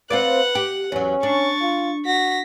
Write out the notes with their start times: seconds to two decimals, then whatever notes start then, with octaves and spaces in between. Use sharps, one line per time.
0.10 C4 F4 B4 D5 F#5 F#6
0.55 G4
0.92 E2 F#3 C#4
1.23 D4 C#6 A6
1.61 F4
2.06 F#4 A#6 B6